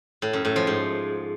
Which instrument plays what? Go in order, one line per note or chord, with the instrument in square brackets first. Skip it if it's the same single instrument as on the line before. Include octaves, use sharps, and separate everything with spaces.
[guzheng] A2
F#2
A2
F3
G#2